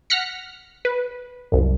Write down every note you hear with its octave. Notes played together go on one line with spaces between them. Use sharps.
F#5 F6 A#6 B6 C#7
B4
C2 F#2